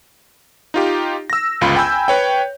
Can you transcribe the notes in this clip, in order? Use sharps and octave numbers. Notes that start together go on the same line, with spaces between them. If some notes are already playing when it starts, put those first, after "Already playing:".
D#4 F4 G4
E6 A#6
G1 C#2 F4 B5
G5 G#5 B5 E6 G6
B4 C#5 G5